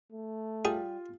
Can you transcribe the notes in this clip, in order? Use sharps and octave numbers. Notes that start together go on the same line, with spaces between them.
A3
G3 F4 G#4